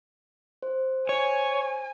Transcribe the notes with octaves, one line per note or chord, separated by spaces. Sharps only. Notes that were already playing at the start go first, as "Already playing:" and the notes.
C5
C#5 G#5